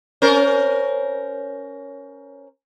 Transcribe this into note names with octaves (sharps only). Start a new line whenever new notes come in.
C#4 A#4 C5